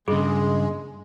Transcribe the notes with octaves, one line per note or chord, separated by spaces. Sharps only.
G2 C#3 G#3 G#4